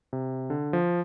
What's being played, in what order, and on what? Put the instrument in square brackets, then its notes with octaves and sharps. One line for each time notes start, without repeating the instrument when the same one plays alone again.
[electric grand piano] C3
D3
F3